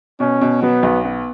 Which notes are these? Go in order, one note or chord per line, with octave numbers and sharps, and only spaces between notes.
B2 C#4
B2
F#3 B3
B1
B3